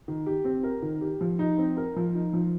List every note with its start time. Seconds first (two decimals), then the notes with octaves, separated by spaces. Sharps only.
0.08 D#3
0.26 G4
0.45 C4
0.63 A#4
0.82 D#3
1.01 G4
1.21 F3
1.39 D#4
1.58 C4
1.77 A#4
1.96 F3
2.15 D#4
2.33 F3